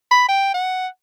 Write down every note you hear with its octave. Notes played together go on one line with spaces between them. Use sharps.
B5
G5
F#5